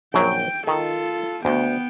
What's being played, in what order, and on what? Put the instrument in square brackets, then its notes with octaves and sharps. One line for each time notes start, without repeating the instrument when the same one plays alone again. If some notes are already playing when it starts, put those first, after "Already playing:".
[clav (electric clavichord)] A#1 F#2 F#3 [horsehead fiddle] G5
[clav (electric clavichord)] D#3 [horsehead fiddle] F4 A4
[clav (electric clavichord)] D2 [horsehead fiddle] B3 G5